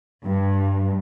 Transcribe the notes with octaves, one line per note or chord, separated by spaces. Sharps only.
G2